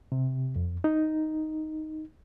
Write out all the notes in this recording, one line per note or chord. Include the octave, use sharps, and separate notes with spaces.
C3
F2
D#4